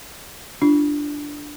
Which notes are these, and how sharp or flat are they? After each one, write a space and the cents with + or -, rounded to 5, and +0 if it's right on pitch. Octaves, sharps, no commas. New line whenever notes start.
D4 +0 F4 -35